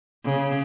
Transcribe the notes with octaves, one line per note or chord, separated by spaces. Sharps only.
C#3